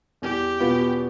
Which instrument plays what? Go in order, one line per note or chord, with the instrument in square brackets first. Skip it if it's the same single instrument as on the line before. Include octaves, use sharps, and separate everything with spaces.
[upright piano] E2 [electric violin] G4
[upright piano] B2 B3 F4